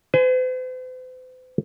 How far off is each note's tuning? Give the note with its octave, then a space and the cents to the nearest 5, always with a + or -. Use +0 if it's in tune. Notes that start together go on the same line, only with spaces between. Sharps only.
C5 -45 G#5 +15